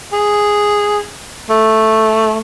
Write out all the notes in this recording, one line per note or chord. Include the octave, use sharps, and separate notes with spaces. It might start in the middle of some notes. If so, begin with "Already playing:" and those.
G#4
A3